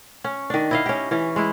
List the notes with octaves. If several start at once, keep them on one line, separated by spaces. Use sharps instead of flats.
C#4
D#3 D4
E4 D#5 F5
C#4 G4
E3 C#4
G#3 E4